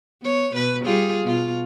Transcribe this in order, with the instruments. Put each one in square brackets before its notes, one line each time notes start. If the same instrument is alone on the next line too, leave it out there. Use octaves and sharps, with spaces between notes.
[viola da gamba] B3 C#5
B2 B4
G3 F4 G#4
B2 F4